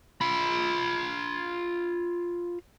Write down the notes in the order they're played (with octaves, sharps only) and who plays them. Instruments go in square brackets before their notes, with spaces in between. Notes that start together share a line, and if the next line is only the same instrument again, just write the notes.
[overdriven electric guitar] F4 B5